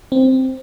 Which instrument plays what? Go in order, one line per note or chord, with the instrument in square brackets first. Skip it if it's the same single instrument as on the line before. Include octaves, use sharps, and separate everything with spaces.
[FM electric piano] C4